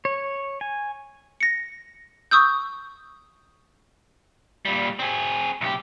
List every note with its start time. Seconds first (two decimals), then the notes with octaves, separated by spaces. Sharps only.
0.05 C#5
0.61 G#5
1.41 A#6 C#7
2.31 C#6 D#6 E6 G6
4.65 A#2 G3
4.99 C4 G#4
5.61 B1 G4